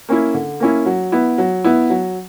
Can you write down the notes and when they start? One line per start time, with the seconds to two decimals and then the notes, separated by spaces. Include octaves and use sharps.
0.09 A#3 C#4 E4
0.34 D3
0.60 A#3 C#4 E4
0.86 F#3
1.12 B3 E4
1.38 F#3
1.64 B3 E4
1.90 F#3